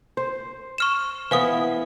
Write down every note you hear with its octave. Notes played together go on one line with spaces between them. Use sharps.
C5
C#6 F6 E7
E3 B3 C5 F5 D#6